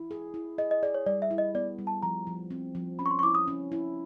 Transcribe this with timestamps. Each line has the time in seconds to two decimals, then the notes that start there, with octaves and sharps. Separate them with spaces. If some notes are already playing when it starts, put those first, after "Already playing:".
Already playing: E4
0.11 G#4
0.34 E4
0.58 G#4 D#5
0.71 D#5
0.83 G#4 D5
0.94 C#5
1.06 G3 D5
1.22 E5
1.31 E4
1.38 D#5
1.55 B3 D5
1.79 G3
1.87 A5
2.02 F3 A#5
2.27 F3
2.51 C4
2.75 F3
2.99 C#4 B5
3.06 C#6
3.11 C6
3.19 C#6
3.23 E4 D6
3.35 D#6
3.47 C#4
3.72 E4